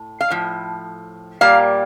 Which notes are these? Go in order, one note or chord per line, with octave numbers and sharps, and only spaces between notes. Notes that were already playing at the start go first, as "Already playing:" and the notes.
Already playing: A2
F5
A2 F3
A#2 G3 A#3 F5